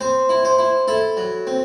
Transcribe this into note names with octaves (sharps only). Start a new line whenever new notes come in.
C4 C5
E4
C5
E4
E4 A4
F#3
C4